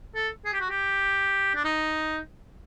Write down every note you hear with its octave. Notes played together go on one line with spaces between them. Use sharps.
A4
G#4
G4
F#4
G4
D4
D#4